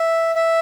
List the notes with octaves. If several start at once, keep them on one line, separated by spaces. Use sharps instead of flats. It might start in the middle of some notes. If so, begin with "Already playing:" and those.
Already playing: E5
E5